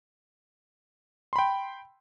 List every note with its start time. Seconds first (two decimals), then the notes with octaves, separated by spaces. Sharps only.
1.33 C6
1.36 B5
1.39 G5